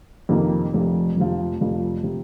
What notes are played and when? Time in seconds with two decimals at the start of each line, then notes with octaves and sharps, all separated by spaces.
0.29 F2 C3 D#3 A#3
0.74 F1 F2 C3 F3
1.16 F1 F2 C3 F3
1.61 F1 F2 C3 F3
2.03 C3 F3